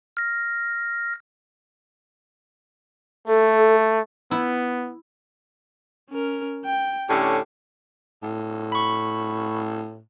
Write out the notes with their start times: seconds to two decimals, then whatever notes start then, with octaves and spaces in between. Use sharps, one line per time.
0.17 F6 A#6
3.28 A3 A4
4.31 B3 E4
6.10 C#4 A#4
6.65 G5
7.09 A2 D3 C#4 G4
8.23 A2
8.72 B5 C#6